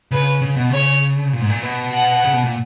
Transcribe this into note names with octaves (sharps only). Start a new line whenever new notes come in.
C#3 B4
C#3
B2
C#3 C#5
A#2
G#2
A#2
B2
F#5
C#3
B2
A#2